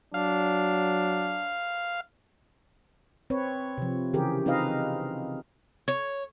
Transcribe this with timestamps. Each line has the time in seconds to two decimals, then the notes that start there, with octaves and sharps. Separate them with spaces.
0.14 F#3 D4 F5
3.30 C4 B4 C#5
3.78 C3 F3
4.13 C#3 E3 G4 G#4 A#4
4.46 C4 D#4 F4 B4 D#5 F5
5.88 C#5